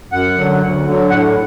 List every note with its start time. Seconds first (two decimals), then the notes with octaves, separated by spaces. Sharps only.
0.12 F#2 F#5
0.37 D3 F#3
0.61 D2
0.86 D3 F#3
1.10 A2 F#5